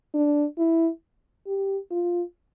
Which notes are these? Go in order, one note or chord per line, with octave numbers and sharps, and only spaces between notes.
D4
E4
G4
F4